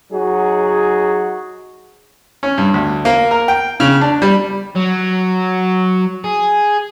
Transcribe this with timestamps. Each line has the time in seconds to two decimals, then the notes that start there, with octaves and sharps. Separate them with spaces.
0.11 F#3 D#4 F#4 G#4
2.43 C#4
2.58 G2
2.74 D2
3.05 A#3
3.31 A#4
3.48 G5
3.80 C#3
4.01 D4
4.22 G3
4.75 F#3
6.24 G#4